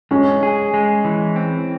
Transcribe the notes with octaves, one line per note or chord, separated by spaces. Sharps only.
G#3 C#4
G#4
G#3
E3
C4